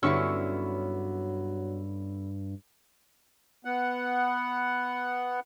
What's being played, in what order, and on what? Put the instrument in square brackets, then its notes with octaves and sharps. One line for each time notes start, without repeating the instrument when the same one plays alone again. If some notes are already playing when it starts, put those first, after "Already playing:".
[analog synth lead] G2 [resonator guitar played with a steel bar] D3 B3 E4 [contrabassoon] F#3 [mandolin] C#4 C#6 E6
[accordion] B3 F#5